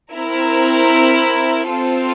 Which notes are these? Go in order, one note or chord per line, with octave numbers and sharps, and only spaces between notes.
C4 E4 A#4
C4 F4 A4